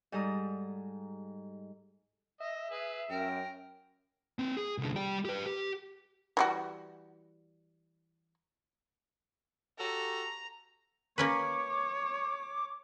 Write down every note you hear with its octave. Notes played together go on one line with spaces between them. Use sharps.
G#2 G3 A4 A#5 D#6
D#5 E5
G#4 B4
F#2 A#4 G5
C4 B4
G#4
C2 D3
G3 G5
G4 B4
G4
E3 G3 F#4
F#4 G4 A4 A#5
A#3 C#4 B4 C#5 D6